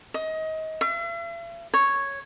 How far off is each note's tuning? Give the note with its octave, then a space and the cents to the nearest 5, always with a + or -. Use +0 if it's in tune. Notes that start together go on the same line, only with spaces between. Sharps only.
D#5 +25
E5 +45
C#5 -5